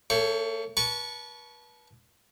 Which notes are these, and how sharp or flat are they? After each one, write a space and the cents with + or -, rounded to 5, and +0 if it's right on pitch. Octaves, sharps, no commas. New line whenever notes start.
A3 +45 A4 -20 C#5 +0
B4 -35 A5 -25 C#6 +5